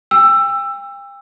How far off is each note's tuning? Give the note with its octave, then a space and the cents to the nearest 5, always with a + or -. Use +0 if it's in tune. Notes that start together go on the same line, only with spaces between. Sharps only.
G5 +35 E6 +15